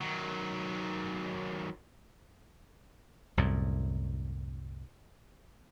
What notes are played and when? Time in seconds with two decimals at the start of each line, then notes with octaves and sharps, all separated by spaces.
0.01 D#3 F#3
3.37 C2 F#2 A2